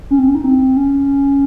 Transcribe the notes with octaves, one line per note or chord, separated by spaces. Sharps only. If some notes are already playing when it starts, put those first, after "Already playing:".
C#4
C4
C#4
D#4
C4
C#4